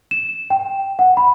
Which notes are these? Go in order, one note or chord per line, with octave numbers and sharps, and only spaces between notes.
E7
G5
F#5
B5